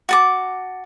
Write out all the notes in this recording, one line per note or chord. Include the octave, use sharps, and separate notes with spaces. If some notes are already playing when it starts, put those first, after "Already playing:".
F#4 A5 D6